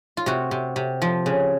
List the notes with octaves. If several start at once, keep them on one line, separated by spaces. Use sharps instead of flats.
F4
C3 F#4
C3
C3
F3
C#3